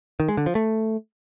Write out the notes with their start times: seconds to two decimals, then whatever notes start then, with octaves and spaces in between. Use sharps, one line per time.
0.20 D#3
0.29 G#3
0.37 D3
0.46 F3
0.55 A3